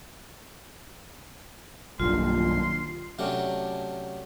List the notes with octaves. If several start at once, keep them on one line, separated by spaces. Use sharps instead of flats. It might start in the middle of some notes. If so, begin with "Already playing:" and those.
B1 G2 D#3 G3 A#3 F4 C6
C3 F#3 A3 C#4 D4